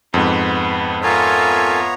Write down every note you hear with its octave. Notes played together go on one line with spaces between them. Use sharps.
F2 G#2 B3
B3 F4 A4 A#4 C#5 E5 G#5 A#5